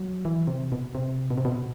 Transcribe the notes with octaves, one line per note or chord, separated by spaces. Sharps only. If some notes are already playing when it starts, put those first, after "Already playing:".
Already playing: F#3
E3
C3
B2
C3
B2
C3
B2